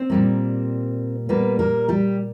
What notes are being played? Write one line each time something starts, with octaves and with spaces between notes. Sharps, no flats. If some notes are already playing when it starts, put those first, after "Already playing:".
Already playing: C4 C5
A#2 G3 A#3
A#2 G3 A#3 B3 B4
A#3 A#4
G3 G4